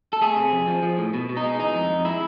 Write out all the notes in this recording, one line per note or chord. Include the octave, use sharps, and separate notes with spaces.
A4
A3 G#4
C3
F2
F3
F3
A2
B2
B2
D#4
G#3
E3 D#4
F2
F2
G#3 E4